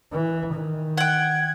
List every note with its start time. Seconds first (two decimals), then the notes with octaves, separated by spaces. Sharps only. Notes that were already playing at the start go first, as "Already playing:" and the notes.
0.12 E3
0.54 D#3
0.97 F#5 G5 G#6